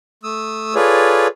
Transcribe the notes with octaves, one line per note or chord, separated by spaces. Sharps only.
A3 D#6 E6
F4 G#4 A4 B4 C#5 D5